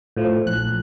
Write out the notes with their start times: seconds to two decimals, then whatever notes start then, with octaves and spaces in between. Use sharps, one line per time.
0.17 A2 F3
0.47 A#1 F#6